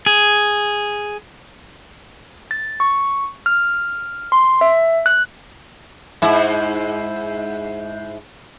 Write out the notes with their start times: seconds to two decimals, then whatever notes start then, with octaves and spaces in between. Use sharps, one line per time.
0.06 G#4
2.51 A6
2.80 C#6
3.46 F6
4.32 C6
4.61 E5
5.06 F#6
6.22 G#2 E4